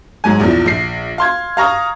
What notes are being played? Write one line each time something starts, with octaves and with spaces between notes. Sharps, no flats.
G#2 F#3 G#5
A#1 E2 E3 F3
A#1 C7
F5 C6 G#6
F5 A#5 C#6 D#6